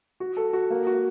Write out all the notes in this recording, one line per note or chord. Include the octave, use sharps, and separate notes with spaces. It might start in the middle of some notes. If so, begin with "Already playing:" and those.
F#4
A4
F#4
A#3
F#4